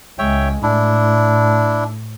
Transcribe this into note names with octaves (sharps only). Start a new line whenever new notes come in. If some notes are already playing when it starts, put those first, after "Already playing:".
C#2 G#3 C#5 E5 G5
A2 D4 E4